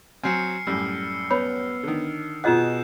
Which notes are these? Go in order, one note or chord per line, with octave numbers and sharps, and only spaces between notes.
F#3 C4 G#5 F6 C7 C#7
F#2 A2 G3 E6
B3 C#5 B5
D3 D#3
B2 F4 G#4 D#5 F#5 F#6 G6 E7